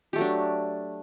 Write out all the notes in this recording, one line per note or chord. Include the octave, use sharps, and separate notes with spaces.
F#3 A3 D4 G4